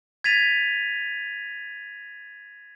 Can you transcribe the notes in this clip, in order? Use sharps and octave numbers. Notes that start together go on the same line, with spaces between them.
G#6 A6 B6 D#7 F7